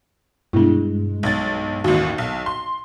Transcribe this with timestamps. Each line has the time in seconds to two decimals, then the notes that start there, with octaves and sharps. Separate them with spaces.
0.53 G2 B2 G#3 D4 E4
1.23 B1 A6
1.84 A1 D#2 F#4
2.18 B1
2.46 C6